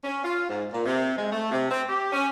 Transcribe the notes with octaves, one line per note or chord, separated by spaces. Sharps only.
C#4
F4
G#2
A#2
C3
G#3
A3
C3
C4
G4
C#4